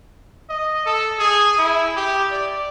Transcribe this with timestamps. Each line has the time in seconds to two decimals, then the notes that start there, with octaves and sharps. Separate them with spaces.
0.49 D#5
0.86 A4
1.19 G#4
1.58 E4
1.96 G4
2.31 D5